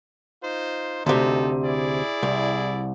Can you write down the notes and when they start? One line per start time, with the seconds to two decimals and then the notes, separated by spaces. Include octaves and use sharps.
0.43 D#4 F4 C5
1.06 D2 C3 C4 D#4 A4
1.63 E4 G#4 D5
2.23 C2